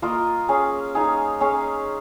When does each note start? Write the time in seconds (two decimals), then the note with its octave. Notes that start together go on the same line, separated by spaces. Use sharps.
0.02 A#3 F4 A#4 D#5
0.49 C#4 G#4 F5
0.95 D#4 G#4 F5
1.41 C#4 G#4 C#5 F5